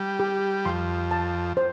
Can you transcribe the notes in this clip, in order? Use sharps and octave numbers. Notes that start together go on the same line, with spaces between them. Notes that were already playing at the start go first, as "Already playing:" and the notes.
Already playing: G3
G4
F2 C6
A5
C5